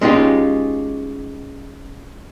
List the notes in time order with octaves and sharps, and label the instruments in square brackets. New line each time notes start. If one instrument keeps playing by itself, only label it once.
[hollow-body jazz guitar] G#3 C#4 D#4 F4 G4